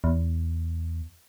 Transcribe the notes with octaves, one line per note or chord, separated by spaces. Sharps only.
E2